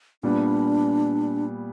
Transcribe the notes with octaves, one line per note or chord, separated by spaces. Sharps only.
A#2 G3 B3 D4